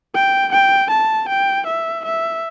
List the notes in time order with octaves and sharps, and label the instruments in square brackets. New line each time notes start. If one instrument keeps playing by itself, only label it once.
[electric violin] G5
G5
A5
G5
E5
E5